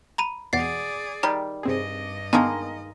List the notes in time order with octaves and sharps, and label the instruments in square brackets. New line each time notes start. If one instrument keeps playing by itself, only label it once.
[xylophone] A#5 B5 D#7
[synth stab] E2 B2 [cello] G#4 D5 [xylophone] F#5 A6 C7
[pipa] D#3 G3 [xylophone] A#5
[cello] G2 D#5 [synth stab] C3 C4 G#4
[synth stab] D3 B3 [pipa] D#3 G#3 A#3 [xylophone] A5